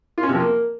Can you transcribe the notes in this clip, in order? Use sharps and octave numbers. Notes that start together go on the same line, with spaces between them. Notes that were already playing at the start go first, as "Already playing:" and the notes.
F4
C#4
C3
F3
A#3